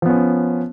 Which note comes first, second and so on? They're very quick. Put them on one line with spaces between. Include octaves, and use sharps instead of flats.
F3 B3 C#4